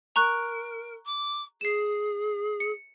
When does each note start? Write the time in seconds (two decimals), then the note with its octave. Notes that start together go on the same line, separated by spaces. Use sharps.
0.16 A#4 A#5 C#6 F#6
1.05 D6
1.61 G#4 C7 E7
2.60 C#7